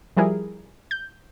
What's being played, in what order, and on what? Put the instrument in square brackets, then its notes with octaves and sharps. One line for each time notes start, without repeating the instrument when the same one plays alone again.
[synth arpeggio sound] F3 G3 E4 G#4 A#4
G6